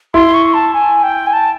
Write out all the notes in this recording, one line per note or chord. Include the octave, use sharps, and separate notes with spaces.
E4 C6
C#6
A5
G#5
G5
G#5
A5